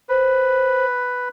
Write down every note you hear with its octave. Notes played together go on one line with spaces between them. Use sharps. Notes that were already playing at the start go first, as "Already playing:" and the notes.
B4 C5